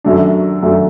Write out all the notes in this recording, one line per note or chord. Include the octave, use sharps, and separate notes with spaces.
F#2 F#3 A3 D4
F#2 F#3 A3 D4